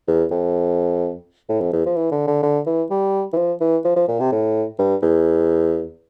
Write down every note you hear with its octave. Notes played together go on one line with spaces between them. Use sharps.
E2
F2
A2
F2
E2
F3
E3
D3
D3
D3
E3
G3
E3
F3
E3
F3
F3
A#2
C3
A2
G2
E2